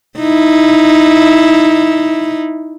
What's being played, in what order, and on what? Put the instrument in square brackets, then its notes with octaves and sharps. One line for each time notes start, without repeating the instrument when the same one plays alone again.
[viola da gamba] D#4 E4